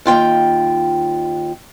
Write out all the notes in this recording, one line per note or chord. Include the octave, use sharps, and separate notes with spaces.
D#2 F4 G5